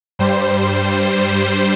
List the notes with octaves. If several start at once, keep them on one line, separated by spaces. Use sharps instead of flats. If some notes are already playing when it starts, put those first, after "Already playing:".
G2 G3 C5